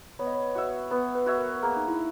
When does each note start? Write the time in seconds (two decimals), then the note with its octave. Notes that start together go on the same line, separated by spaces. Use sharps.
0.19 B3 C#5
0.27 D#5
0.35 C#5
0.55 F#4 C#5 E5
0.91 B3 B4
1.15 B4
1.26 F#4 C#5 E5
1.38 A#4
1.63 A#3 G#4
1.76 D#4
1.88 E4